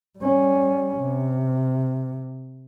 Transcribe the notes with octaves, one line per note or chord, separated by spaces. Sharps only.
G3 C#4
C3